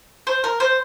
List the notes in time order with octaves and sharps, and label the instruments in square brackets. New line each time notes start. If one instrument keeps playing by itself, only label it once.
[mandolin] C5
A#4
C5